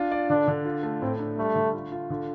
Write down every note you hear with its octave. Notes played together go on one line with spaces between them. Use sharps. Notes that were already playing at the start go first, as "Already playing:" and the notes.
Already playing: D4 F4
D5
D3 D4
D3
F4
A3
A2 C4
D4
G3 A3
D3
F4
F4
D3